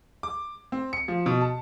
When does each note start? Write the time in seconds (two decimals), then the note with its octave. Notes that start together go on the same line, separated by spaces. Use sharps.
0.23 D6
0.72 C4
0.93 C#7
1.08 F3
1.26 B2
1.41 A5